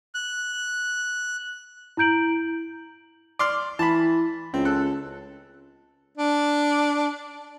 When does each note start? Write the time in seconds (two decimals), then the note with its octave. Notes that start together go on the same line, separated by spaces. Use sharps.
0.15 F#6
1.97 E4 A#5 G6 D7 F#7
3.39 D5 C6 F6
3.79 E3 A5 B5
4.54 C#2 C4
4.65 A4 F#6
6.18 D4